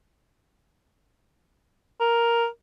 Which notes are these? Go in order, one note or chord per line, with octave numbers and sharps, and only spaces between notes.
A#4